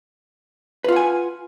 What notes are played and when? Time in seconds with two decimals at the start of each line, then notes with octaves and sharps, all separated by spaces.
0.84 B4
0.88 F4
0.92 F#5
0.96 G#5